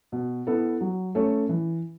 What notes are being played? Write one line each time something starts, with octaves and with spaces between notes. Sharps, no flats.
B2
B3 E4 A4
F#3
A3 C#4 A4 C#5
E3